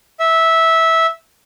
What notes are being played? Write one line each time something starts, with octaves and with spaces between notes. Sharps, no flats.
E5